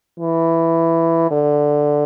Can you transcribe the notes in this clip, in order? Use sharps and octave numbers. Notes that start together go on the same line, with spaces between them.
E3
D3